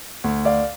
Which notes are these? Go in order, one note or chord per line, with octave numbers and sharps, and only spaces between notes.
D2
D5 F5